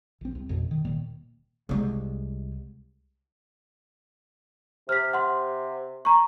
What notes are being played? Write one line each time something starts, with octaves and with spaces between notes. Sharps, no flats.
A#1 C4
C2
A1 F2 B2
D#3
D#1 A#2 D#3 A#3
C2 G#3
C3 F6 B6
F#5 C6
A#5 C#6